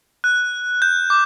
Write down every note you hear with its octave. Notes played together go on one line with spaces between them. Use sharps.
F#6
G6
D6